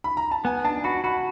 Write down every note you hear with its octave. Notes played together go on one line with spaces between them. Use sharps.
B5
A#5
A5
B3 G#5
D4 A5
F#4 B5
F#4 B5